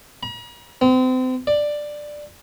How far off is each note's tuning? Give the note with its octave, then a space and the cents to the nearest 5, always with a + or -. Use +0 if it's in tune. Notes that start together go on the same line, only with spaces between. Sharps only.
A#5 +45
C4 -35
D5 +10